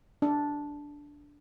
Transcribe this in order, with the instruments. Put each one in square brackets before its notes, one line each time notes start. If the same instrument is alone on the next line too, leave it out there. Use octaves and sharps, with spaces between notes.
[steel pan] D4